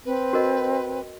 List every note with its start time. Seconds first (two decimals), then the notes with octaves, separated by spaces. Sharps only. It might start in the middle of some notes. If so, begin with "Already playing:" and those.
0.06 C4 B4
0.33 F#4 A#4 D#5